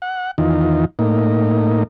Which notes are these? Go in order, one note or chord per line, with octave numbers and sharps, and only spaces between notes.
F#5
E2 D#3 D#4 F4
A2 A#3 D#4